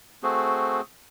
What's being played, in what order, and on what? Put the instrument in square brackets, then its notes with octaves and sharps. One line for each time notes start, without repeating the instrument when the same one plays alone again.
[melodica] A3 C4 F#4 G#4